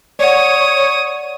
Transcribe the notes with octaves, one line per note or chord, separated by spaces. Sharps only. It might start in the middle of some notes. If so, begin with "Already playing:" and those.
C#5 D5 F#5 D#6